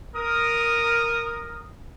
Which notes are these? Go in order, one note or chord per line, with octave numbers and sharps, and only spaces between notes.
A#4 D#6